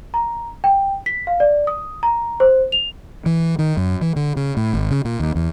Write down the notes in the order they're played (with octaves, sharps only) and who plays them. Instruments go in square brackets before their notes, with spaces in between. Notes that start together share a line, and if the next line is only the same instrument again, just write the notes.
[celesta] A#5
G5
B6
F5
D5
D#6
A#5
C5
F7
[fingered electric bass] E3
D#3
F#2
E3
D3
C#3
A2
G#1
C#3
A#2
D#2
E2